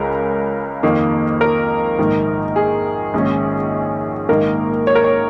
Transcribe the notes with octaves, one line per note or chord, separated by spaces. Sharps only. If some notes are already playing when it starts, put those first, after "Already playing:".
Already playing: C#2 C#3 G#3 C#4 A#4
F2 D#3 A#3
A#4
A#1 G#2 D#3
G#4
A#1 G#2 D#3 C#4
A#1 G#2 D#3 A#3 A#4
C#5
A#4
C#5